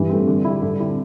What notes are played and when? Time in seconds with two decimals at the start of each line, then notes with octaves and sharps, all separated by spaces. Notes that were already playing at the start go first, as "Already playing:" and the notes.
Already playing: G2 E3
0.09 A3 C4
0.27 D3
0.45 G3 E4
0.62 G2 D3
0.80 C4 E4